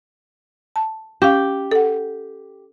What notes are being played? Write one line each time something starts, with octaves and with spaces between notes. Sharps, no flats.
A5
C#4 G4 F5
A4 F#5